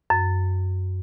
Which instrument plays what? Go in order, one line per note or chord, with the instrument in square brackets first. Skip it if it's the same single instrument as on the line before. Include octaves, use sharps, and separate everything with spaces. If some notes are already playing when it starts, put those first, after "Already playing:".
[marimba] F#2